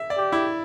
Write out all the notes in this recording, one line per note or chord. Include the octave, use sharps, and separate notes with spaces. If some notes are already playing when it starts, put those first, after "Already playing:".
Already playing: E5
D5
G4
E4